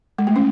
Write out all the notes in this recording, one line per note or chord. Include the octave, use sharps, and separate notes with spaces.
G#3
A3
C#4